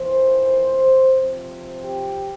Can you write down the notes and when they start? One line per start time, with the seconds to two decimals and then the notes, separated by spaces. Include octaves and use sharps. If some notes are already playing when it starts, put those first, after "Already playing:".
Already playing: F2 E3 A#3 C5
1.17 C3 F3 C4
1.85 G4